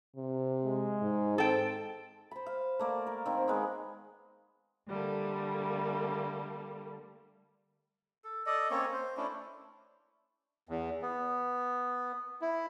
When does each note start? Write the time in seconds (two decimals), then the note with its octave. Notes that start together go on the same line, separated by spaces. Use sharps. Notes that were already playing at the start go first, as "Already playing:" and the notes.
0.16 C3
0.65 G#3
1.02 G#2
1.38 C4 A4 G5
2.31 C5 B5
2.46 F5
2.79 A3 A#3 D5
3.07 A#4
3.26 D#3 A#3 C4
3.48 G#3 B3
4.88 D3 G3 A3 A#3
8.24 A4
8.46 A4 D5 D#5
8.71 A#3 C4 C#4 C#5
8.93 C5
9.17 A3 C#4 D4 E4
10.69 E2
11.02 B3
12.41 E4